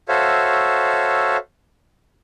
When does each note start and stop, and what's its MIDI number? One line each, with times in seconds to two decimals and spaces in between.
0.08 1.37 66
0.08 1.37 69
0.08 1.37 72
0.08 1.37 73
0.08 1.37 76
0.08 1.37 77